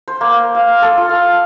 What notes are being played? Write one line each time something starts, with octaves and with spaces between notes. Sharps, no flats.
C5
A#3
F5
A4
F4
F5